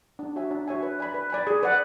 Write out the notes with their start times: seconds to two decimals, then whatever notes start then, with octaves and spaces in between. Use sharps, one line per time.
0.19 D4
0.36 F#4 C#5 E5 G#5
0.51 D4
0.68 F#4 C#5 E5 G#5
0.83 B4
0.99 D5 G#5 B5
1.14 B4
1.30 D5 G#5 B5
1.47 G#4
1.63 B4 D5 F#5